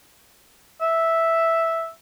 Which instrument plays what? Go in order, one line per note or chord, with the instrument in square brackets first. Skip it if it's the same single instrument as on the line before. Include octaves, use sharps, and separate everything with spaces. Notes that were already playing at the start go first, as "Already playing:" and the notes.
[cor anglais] E5